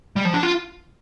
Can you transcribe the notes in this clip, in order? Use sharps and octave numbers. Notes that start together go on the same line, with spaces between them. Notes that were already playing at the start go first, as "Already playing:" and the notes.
G3
F3
D4
F4